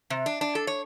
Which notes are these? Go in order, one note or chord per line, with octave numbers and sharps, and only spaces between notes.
C3
D4
D4
A4
C#5